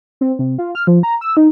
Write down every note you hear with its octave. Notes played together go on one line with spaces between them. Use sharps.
C4
C3
F4
F6
F3
A#5
E6
D#4